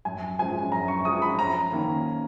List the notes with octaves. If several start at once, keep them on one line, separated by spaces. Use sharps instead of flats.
F#2 G#5
F3 G#3 C#4 G#5
F#2 A#5
C#6
F3 G#3 C#4 D#6
B5
F2 A#5
D#3 A#3 C#4